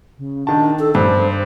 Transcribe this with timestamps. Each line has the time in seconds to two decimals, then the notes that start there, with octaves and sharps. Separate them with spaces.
0.18 C#3
0.47 D#3 D4 A5
0.79 A4
0.95 G2 C5